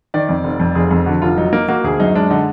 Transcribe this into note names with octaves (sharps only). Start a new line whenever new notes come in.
D#3 D5
F2
F1
F2
F1 G#4
F2
D3 F#4
F1 F4
F#3 D#4
A#3 D#4
A#3 F#4
D2 G#4
F#2 D#4
G#3 D4
D3 D#4